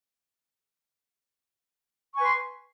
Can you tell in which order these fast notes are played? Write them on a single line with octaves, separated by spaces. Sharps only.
C#6 G#5 B4 C6